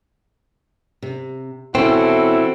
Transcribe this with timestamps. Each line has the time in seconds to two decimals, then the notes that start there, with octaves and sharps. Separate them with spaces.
1.02 C3
1.75 B2 E3 C4 C#4 E4 F#4 A4